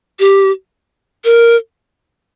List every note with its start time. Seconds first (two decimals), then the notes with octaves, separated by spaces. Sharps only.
0.20 G4
1.25 A#4